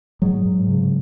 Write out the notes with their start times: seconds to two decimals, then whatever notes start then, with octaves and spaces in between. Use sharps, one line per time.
0.22 G#2 F#3 G#3
0.45 G#2
0.68 C#3